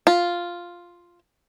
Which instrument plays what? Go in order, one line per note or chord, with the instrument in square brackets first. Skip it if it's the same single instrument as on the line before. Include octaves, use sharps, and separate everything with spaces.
[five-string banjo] F4